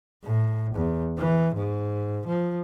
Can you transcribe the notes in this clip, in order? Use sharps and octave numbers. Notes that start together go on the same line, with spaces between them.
A2
E2
E3
G#2
F3